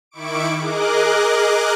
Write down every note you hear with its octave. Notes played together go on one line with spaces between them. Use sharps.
D#3 E4 C#6 D6 D7
G#4 A#4 D#5 D6 F#6